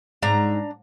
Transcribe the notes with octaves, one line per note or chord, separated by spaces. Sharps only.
G#2 D4 A#5